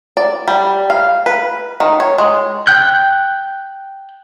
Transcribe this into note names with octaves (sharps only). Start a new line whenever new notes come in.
D5
G3
F5
B4
D#3
C#5
G#3
G5 F#6 G6